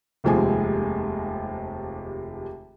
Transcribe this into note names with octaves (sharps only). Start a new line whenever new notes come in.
F1 D#2 C3 F3 G#3 G#5